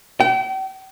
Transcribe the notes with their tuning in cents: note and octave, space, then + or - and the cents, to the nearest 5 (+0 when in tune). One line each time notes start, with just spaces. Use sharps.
G5 -40